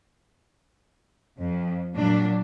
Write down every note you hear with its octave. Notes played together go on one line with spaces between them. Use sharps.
F2
A#2 F#3 D4